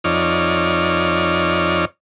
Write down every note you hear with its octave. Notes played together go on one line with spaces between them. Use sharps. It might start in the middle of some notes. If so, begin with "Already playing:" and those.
F2 D#4 C#5 D5 F6